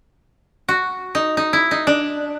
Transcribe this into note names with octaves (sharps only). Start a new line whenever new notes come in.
F#4
D#4
D#4
E4
D#4
D4